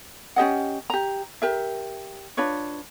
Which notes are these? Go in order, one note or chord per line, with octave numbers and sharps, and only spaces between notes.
C#4 G4 D#5 F#5
G4 A#5
G4 A#4 E5
D4 F4 B4 C#5